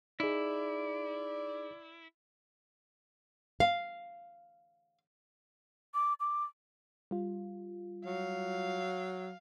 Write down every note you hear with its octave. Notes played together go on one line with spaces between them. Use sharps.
D#4 E4 G#4 D5
F5
D6
D6
G3 F4
F#3 F5